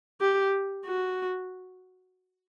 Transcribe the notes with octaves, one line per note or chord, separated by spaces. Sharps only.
G4
F#4